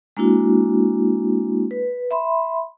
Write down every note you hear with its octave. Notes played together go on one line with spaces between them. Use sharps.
G#3 A#3 D4 E4 F#4
B4
E5 B5 C6